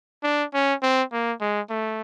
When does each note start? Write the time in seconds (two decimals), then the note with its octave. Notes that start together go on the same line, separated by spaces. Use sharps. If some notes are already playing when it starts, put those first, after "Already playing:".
0.23 D4
0.53 C#4
0.82 C4
1.12 A#3
1.41 G#3
1.70 A3